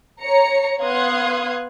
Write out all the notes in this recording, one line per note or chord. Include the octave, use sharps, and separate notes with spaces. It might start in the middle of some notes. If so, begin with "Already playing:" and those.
C#5 A#5 C#7
B3 F5 C6 D#6 F#6 G#6